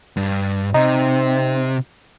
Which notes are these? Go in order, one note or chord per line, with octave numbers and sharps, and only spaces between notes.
G2
C3 C4 D#4